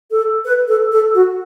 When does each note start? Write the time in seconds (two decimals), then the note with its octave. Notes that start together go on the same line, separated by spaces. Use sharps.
0.11 A4
0.45 B4
0.68 A4
0.92 A4
1.14 F#4